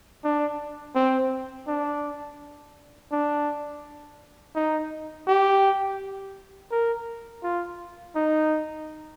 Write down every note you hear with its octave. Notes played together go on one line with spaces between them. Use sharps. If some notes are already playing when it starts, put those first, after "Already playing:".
D4
C4
D4
D4
D#4
G4
A#4
F4
D#4